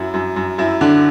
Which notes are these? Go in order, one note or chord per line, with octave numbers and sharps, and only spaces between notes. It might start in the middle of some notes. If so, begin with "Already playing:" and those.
Already playing: F#2 E4
F#2
F#2
F#2 E4
D3 D4